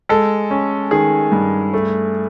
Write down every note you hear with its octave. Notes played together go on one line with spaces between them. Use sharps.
G#3 A4
C#4
D#3 G#4
G2
A3